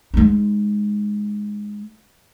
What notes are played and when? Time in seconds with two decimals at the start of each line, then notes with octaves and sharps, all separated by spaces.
0.14 G#3 D#4